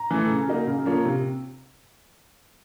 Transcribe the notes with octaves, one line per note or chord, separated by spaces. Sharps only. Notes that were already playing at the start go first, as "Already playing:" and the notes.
Already playing: A#5
E3 A3
C#3
F#3 A#3 D#4
C#3
F3 A#3 C#4
C3